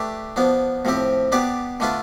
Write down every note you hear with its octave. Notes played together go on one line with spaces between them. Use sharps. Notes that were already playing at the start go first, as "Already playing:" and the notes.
Already playing: A3 D4 G4 B4
F3 B3 D4
A2 F3 C4 G4
B3 D4 G4 B4 D5
D3 A3 D4 F4 B4